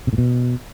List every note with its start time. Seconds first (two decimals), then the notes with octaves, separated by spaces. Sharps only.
0.07 C3
0.13 A2
0.18 B2